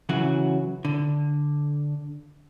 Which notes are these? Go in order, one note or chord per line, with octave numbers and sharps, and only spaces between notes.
C#3 E3 F#3 F#4
D3